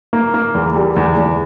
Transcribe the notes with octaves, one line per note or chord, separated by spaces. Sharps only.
A#3
A#3
E2
G3
E2
E2